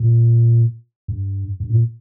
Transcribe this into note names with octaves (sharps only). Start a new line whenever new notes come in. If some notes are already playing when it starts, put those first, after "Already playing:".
Already playing: A#2
G2
G2
A#2